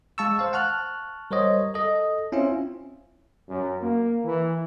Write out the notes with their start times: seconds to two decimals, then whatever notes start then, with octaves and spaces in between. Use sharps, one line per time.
0.18 G#3 F5 A5 C#6 E6
0.39 C5 F5
0.53 F#5 A5 C#6 F6 F#6
1.31 G3 A#4 C5 C#5 D#5
1.74 A4 D#5
2.32 C4 C#4 E4 F4 E5
3.49 F#2
3.82 A#3
4.24 E3